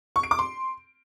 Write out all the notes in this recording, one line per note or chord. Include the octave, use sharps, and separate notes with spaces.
C#6
D7
D6
C6